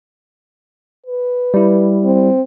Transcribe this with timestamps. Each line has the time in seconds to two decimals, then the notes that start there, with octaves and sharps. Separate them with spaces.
1.07 B4
1.54 G3 E4
2.05 C4